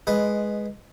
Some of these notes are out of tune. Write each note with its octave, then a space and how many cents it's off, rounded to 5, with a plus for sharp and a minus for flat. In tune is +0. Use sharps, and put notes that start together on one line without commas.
G#3 +5 B4 +0 D#5 -10